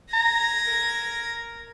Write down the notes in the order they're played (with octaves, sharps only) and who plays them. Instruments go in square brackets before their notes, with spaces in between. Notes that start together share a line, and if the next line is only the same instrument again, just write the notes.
[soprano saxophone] A#5 [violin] G#6 A#6
[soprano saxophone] A#4